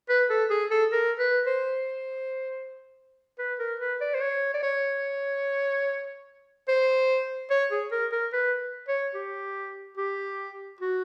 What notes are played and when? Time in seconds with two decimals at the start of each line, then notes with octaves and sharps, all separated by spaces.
0.09 B4
0.30 A4
0.50 G#4
0.71 A4
0.92 A#4
1.19 B4
1.47 C5
3.39 B4
3.59 A#4
3.79 B4
4.01 D5
4.14 C5
4.21 C#5
4.54 D5
4.62 C#5
6.68 C5
7.50 C#5
7.71 G#4
7.91 A#4
8.12 A#4
8.33 B4
8.88 C#5
9.15 G4
9.97 G4
10.80 F#4